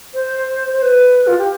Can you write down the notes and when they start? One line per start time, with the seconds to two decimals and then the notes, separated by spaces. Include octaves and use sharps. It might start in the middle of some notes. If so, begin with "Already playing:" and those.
0.14 C5
0.73 C5
0.82 B4
1.27 F4
1.38 G4